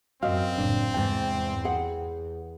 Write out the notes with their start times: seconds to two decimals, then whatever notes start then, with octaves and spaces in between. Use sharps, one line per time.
0.23 F#2 C4 F#4 D#5 F5
0.58 F#1 A2 D4
0.94 E2 G#2 C3 G5
1.65 G#4 F#5